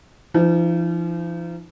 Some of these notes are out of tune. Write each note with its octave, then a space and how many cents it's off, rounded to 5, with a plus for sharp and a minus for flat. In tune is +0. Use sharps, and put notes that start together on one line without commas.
F3 -40 D#4 +0